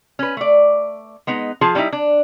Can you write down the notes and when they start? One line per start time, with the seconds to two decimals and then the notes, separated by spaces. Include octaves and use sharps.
0.19 C#4 B4
0.37 A3 D5
1.27 G#3 B3 D#4
1.61 F3 F4 G#4 A5
1.75 G3 C4 C#4 D#4 E4
1.93 D4